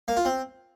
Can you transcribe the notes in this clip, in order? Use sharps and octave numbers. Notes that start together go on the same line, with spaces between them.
A#3
F4
C4